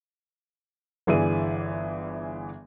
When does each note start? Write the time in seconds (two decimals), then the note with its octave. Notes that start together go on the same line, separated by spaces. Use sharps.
1.07 G1 E3 G#4 D5 E5 D#7